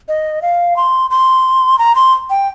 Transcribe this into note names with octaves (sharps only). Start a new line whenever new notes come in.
D#5
F5
C6
C6
A#5
C6
G5